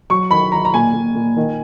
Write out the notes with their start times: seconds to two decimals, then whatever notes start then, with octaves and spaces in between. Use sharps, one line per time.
0.10 F#3 C#6
0.31 D#3 B5
0.52 D#3 A#5
0.65 A#5
0.74 A#2 G#5
0.94 A#2
1.15 A#2
1.37 D#3